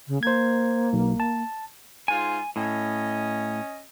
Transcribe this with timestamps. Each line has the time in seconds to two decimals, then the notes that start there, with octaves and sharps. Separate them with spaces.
0.08 C#3
0.23 A#3 C5 G#6
0.93 B1
1.20 A5
2.08 G#2 F4 G#5
2.56 A2 C#4 D#5